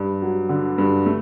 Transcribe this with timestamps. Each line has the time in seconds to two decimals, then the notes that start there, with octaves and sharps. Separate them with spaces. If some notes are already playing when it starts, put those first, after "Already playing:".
Already playing: G2
0.22 F#3
0.49 D3
0.78 G2
1.06 A3